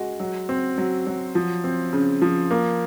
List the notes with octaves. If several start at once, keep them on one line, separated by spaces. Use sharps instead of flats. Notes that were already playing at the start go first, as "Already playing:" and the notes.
Already playing: G#3 F#4
F#3
C4
F#3
F#3
F3
C4
C#3
F3
A#3